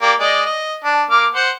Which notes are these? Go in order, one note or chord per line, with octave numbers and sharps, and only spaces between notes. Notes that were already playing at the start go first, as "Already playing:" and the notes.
A#3 G4 D5
G#3 D5 D#5
D#5
D4 A5
A#3 D6 F6
C5 F#5 C6